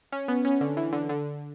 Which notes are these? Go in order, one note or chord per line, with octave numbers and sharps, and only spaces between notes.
C#4
B3
C#4
D3
E3
D3
D3